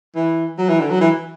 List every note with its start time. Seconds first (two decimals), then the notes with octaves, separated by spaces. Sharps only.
0.15 E3
0.58 F#3
0.69 E3
0.80 D3
0.90 F#3
1.01 E3